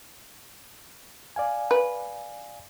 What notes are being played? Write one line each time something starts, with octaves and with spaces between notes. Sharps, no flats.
D5 F5 G#5
B4